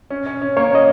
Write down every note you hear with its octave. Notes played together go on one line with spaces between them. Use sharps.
C#4
C#4
C#4
A#3 C#5
C#4 D#5